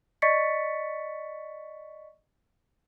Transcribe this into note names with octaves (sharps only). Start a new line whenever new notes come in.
D5 D#5 C#6 A6 B6 C#7